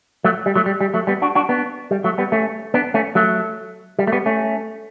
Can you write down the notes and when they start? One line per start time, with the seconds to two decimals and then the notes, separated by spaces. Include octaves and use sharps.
0.24 F#3 A3
0.46 G3
0.56 F#3 A3
0.66 G3
0.81 G3
0.94 F#3 A3
1.07 G3 B3
1.22 D4 F#4
1.35 D4 F#4
1.49 B3 D4
1.91 G3
2.04 F#3 A3
2.18 G3 B3
2.32 A3 C#4
2.74 B3 D4
2.94 A3 C#4
3.15 F#3 A3
3.99 G3
4.07 A3
4.12 G3 B3
4.26 A3 C#4